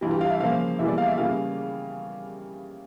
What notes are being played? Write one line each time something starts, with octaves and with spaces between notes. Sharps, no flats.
G2 E3 G3 F4
G4
F5
E5
C#3 F3 A#3 F5
E2 E3 G3 A#3 E5
D5
F5
E5
C#3 G3 A#3 F5